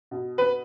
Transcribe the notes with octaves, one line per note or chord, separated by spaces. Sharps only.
B2
B4